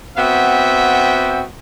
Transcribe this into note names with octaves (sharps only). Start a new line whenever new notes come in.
B3 C4 F#4 E5 G5